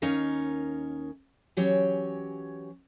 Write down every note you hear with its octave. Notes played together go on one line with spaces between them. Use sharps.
D#2 C#4 D#4 A#4 F5
E3 F#3 C#4 G4 C#5